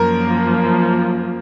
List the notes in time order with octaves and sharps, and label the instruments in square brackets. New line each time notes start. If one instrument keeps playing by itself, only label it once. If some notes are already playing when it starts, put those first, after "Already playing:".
Already playing: [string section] F#2 F3 A#3 [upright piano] A#4